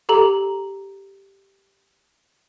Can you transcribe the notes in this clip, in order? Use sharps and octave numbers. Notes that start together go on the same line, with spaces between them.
G4 A4 A#5 F#7